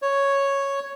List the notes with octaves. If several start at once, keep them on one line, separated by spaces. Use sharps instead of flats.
C#5